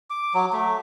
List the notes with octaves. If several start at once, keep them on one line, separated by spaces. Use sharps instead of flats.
D6
F#3
A3